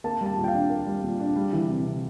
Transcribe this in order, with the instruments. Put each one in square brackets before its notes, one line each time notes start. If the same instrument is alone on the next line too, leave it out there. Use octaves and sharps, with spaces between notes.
[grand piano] A#3 A5
G3
A5
A#2
G5
F5
D4
A#3
G3
A#2
D4
G3
E3
C3
C3